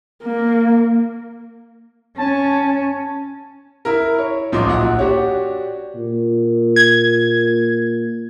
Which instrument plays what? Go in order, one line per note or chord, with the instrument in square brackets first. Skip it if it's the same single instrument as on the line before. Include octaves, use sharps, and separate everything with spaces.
[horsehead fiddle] A#3
[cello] C#4 [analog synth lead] A5
[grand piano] E4 A#4
C#5
A1 F3 F#3 D#4 C6 D6
A#1 F#5
D4 F#4 G4 C#5
[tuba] A#2
[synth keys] G#6